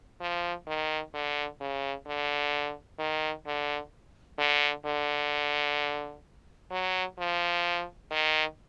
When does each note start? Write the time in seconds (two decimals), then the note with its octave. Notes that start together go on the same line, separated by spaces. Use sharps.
0.20 F3
0.67 D#3
1.14 D3
1.60 C#3
2.07 D3
2.99 D#3
3.46 D3
4.38 D3
4.85 D3
6.71 F#3
7.19 F3
8.11 D#3